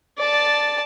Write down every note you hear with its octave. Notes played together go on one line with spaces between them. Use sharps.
D5 A5